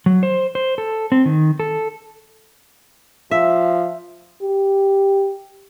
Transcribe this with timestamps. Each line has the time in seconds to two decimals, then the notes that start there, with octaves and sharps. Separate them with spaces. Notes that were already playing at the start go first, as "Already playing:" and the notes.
0.06 F#3
0.23 C5
0.55 C5
0.78 A4
1.12 C4
1.25 D#3
1.60 A4
3.31 F3 E5
4.42 G4